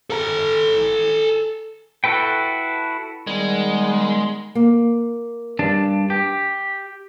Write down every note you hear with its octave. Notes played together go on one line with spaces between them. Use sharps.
A4 A#5
E4 F#4 A4 B4 G5
D#3 G3 G#3 B3
A#3
G2 D4 A5
G4